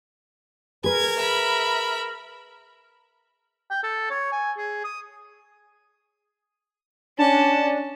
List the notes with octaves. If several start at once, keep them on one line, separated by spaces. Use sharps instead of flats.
G#4 A#4 B4 G#6
E5 B5
G5
A4
C#5
G#5
G#4
D#6
C#4 D4 A5